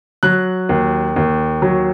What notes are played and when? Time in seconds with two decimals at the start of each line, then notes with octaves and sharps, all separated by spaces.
0.23 F#3 F#6
0.69 D#2
1.16 D#2
1.62 F#3